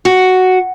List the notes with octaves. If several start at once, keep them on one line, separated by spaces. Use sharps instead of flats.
F#4